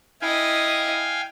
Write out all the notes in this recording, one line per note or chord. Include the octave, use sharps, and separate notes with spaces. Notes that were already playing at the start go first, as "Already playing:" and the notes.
E4 D#5 F5 G5 G#5